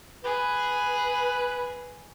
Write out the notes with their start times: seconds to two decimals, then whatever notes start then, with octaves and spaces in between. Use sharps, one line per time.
0.24 G#4 B4